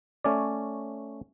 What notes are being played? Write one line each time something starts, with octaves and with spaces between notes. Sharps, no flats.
A3 C#4 C#5 D5